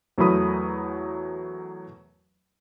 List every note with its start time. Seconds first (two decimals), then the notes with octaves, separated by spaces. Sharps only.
0.18 E2 F#3 A3 A#4 B5 D#6